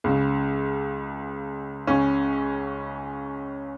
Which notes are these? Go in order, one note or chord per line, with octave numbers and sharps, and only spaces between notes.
C#2 C#3
C#2 C#3 C#4